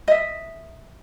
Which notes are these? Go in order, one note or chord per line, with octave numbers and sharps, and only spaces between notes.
D#5 E5